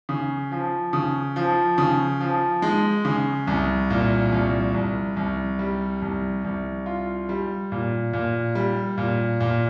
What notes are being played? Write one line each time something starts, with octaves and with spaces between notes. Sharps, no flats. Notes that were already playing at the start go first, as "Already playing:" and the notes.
C#3
F3
C#3
F3
C#3
F3
G#3
C#3
C2
A#2
C2
C2
C2
G3
C2
C2
F4
G3
A#2
A#2
G3
A#2
A#2